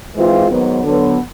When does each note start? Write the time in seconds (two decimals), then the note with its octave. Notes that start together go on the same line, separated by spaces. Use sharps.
0.15 G#2 E3 G#3 C4 F4
0.49 G#2 D#3 F#3 B3
0.83 D3 F#3 B3